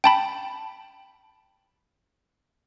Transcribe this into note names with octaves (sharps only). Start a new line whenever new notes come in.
G5 A5 B5